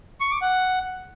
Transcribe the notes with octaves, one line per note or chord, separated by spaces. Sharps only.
C#6
D6
F#5